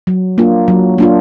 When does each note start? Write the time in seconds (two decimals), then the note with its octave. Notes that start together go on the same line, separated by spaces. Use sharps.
0.07 F#3
0.38 A#3 D4 F4
0.68 F#3
0.98 A#3 D4 F4